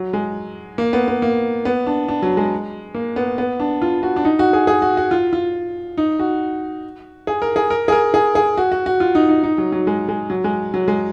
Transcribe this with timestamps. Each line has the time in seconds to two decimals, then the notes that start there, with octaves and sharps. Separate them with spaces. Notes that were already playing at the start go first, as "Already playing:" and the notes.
Already playing: F#3
0.13 G#3
0.78 A#3
0.93 B3
1.08 B3
1.22 A#3
1.65 B3
1.86 D4
2.08 D4
2.22 F#3
2.37 G#3
2.94 A#3
3.16 B3
3.38 B3
3.60 D4
3.82 F4
4.03 F#4
4.16 D4
4.25 D#4
4.39 F#4
4.53 G#4
4.67 G#4
4.82 F#4
4.97 F#4
5.11 F4
5.33 F4
5.98 D#4
6.19 F#4
7.27 G#4
7.42 A#4
7.56 G#4
7.70 A#4
7.88 G#4
7.92 A#4
8.14 G#4
8.35 G#4
8.57 F#4
8.72 F#4
8.86 F#4
9.00 F4
9.15 D#4
9.29 D#4
9.43 D#4
9.58 F#3
9.72 F#3
9.87 G#3
10.09 G#3
10.30 F#3
10.44 G#3
10.74 F#3
10.88 G#3